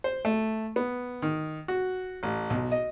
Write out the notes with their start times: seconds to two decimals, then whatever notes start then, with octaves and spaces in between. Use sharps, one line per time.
0.04 C5
0.25 A3
0.76 B3
1.22 D#3
1.68 F#4
2.23 A1
2.50 B1
2.72 D#5